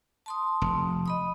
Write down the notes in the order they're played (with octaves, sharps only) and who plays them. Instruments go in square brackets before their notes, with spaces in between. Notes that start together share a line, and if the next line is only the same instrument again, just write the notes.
[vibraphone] A5 C6 D#6
[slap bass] F1
[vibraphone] D#5 B5 D#6